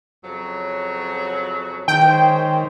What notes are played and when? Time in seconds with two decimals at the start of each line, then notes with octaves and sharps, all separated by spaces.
0.24 F2 C#3 F#3
1.88 E2 D#3 G5
2.06 G#2 C#4 C5